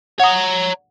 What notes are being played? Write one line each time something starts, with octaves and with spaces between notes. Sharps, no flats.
C#5 F#5 A#5 D#6